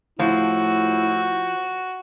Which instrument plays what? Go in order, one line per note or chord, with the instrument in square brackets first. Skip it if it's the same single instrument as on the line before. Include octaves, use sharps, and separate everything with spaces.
[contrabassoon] A2 [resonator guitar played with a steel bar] F3 [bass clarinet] E4 [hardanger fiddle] F#4